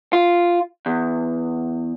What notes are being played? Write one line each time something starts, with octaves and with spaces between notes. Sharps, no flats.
F4
E2